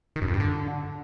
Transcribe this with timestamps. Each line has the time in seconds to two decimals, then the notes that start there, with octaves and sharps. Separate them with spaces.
0.16 D#3
0.22 F#2
0.28 F2
0.34 G2
0.40 D3